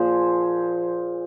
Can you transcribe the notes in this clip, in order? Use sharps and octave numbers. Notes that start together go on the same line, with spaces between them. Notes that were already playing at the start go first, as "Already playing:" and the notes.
Already playing: A#2 F3 G#4 C5